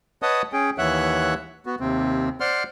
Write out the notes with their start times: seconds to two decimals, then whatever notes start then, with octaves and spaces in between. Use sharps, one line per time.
0.22 B4 C#5 D#5 F#5 A5 D#6
0.53 C#4 G#4 G5
0.78 D#2 E3 C#5 E5 F#5 F#6
1.66 B3 F#4
1.80 D#2 C3 C4
2.40 C5 D5 F#5 C6 F6